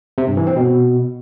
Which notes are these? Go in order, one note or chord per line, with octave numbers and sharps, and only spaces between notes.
C3
G2
E3
C4
B2